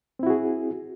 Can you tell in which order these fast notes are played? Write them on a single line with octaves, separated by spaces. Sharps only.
C4 E4 F#4 G#4